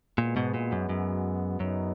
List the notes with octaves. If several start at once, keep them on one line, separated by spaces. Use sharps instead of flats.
A#2 G#3 B3 F#4
G#2 B2
A#2
F#2
F#2
F#2 C#3 F#3 B3 D#4